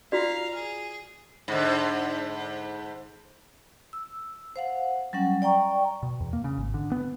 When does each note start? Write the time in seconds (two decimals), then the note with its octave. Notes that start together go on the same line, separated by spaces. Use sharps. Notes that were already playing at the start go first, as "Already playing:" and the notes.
0.12 F4 F#4 D5 F5 A#5
0.55 G#4
1.48 G#2 D3
3.93 E6
4.56 C5 F5 F#5
5.13 F#3 G3 C#4 F#5
5.42 D5 G5 A#5 C#6
6.03 B2
6.20 E2
6.33 A#3
6.44 C#3
6.57 G#1
6.74 D3
6.92 B3